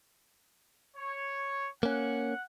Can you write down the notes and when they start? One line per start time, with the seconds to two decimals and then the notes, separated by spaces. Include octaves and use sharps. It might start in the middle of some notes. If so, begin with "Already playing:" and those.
0.97 C#5
1.83 A#3 C#4 F#5